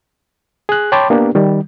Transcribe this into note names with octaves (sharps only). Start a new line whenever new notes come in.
G#4 F#6
C#5 G5 A5 B5 C6 D6
A#3 B3 D4 G4
D#3 G3